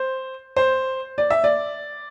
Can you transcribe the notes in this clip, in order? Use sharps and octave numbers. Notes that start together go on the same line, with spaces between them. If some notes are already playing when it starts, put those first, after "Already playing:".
Already playing: C5
C5
D5
E5
D5